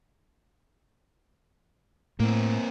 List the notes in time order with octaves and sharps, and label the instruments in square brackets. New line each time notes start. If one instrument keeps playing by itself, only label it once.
[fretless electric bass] A2 [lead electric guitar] A#3 C4